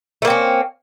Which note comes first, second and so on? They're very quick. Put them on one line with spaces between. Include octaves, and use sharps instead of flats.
A3 A#3 C4 C#4